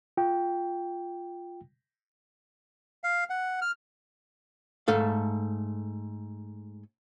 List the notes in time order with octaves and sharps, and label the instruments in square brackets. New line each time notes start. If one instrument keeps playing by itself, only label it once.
[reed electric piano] F4 G5
[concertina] F5
F#5
F6
[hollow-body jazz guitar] G#2 A3 A4 F5